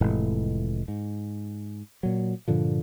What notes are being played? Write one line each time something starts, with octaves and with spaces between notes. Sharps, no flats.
F1 A2 E3 G#3
G#2
A#2 F#3
G2 A#2 D3 F3